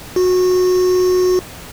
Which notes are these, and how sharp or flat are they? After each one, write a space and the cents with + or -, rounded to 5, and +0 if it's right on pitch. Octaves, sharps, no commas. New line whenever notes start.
F#4 -20